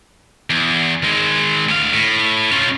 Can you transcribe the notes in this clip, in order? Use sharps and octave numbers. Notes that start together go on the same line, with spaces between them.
E2
D#3 G#3
D2 F5
A2
C#4 F4